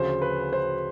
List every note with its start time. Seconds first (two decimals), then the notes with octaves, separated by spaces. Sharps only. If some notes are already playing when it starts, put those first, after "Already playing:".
Already playing: D2 C#3 F3 C5
0.22 B4
0.53 C5